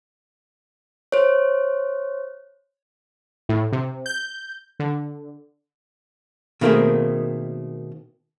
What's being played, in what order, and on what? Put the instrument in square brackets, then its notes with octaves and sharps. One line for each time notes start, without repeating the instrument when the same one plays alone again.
[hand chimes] C5 C#5
[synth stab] A2
C3
G6
D3
[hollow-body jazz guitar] B2 D#3 A3 A#3 C4 G#4